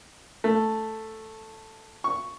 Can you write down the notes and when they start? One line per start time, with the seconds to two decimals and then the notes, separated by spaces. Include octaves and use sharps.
0.44 A3
2.04 C#6